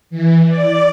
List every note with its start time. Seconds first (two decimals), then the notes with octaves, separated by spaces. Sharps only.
0.10 E3
0.47 D5